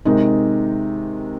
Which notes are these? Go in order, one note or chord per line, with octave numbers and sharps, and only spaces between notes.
C3 D#3 G#3 D#4